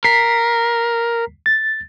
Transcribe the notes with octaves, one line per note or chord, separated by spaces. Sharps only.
A#4 B6 C7
A6